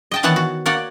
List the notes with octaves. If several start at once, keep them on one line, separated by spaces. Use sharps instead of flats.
D#5 G5 A5
D#3 E3 B3 C#5 F#5 A5
F#4
A#3 C#5 D5 F#5